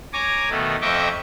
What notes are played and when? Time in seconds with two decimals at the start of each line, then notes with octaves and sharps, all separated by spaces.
0.13 C#5 G#5 A#5 D6
0.50 B2 D#3 A3
0.81 F2 D#5 E5 G5 C#6 D6